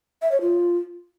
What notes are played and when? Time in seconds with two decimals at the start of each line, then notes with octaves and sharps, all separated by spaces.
0.22 E5
0.32 C#5
0.41 F4